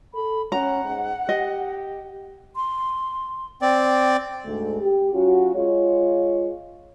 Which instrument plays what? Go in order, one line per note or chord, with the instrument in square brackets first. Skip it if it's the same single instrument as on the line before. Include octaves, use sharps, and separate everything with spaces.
[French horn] A4 [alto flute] B5
[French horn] C#4 [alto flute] F#5 [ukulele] A#5
[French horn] G#2
[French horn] G4 [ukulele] D#5
[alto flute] C6
[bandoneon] C4 D5 [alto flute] G5
[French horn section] D2 G#2 D3 G#3 A3
G4
F#3 C#4 F4 F#4
G#3 F4 C#5